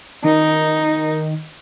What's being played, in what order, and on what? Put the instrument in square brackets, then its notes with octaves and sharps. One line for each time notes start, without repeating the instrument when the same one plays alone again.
[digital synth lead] D#3 [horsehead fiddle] D#4